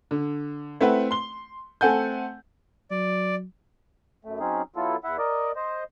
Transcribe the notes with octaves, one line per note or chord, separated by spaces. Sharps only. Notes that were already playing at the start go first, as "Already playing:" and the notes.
D3
A3 C4 E4 B4 F#5
C6 G7
A3 C4 A4 F#5 G#5 G6
F#3 D5
F#2 A3
F#3 C4 C#4 D#4 G#4
F#3 B3 E4 F4 A4
E2 E4 E5 F#5
A#4 D5 D#5
C5 D#5